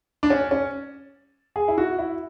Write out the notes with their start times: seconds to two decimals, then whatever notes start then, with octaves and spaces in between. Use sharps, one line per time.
0.23 D4
0.30 C#4
0.51 C#4
1.56 G#4
1.68 E4
1.78 F#4
1.98 E4